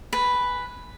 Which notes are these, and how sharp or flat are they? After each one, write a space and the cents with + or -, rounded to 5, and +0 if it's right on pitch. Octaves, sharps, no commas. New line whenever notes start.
B4 +0 G#5 +0